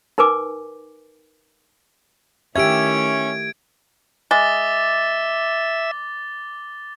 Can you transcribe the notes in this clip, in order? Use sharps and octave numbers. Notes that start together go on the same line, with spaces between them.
D#4 A#4 B4 G#5 D6
D#3 A3 C#4 E4 G4 E5 G#6 D7
G#3 E5 D6 A6 G7